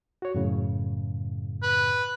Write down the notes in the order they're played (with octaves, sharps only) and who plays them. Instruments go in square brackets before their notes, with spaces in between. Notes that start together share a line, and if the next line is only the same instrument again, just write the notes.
[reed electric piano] F#4 C#5
F#2 A2 C#3
[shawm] B4